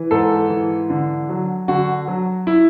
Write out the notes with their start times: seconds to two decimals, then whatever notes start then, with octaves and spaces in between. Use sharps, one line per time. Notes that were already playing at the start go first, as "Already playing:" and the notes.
Already playing: E3
0.11 G#2 A4
0.50 E3
0.90 D3
1.29 F#3
1.68 D3 F#4
2.08 F#3
2.47 E4